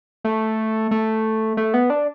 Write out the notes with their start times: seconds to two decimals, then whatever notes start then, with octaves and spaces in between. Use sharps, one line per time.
0.24 A3
0.91 A3
1.57 A3
1.74 B3
1.90 D4